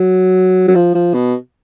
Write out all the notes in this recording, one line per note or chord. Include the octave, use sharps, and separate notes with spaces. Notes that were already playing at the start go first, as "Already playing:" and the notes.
Already playing: F#3
F#3
F3
F3
B2